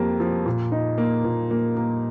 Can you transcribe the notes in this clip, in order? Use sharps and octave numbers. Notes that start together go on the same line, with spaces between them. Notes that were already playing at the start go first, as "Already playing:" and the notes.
Already playing: F2 A#3 G4
F3
A#2
D#4
A#3
A#2
A#3
A#3